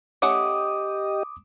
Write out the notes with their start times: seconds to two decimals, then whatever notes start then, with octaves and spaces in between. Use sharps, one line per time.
0.22 A3 C#4 G4 D#5 F#5 D6 D#6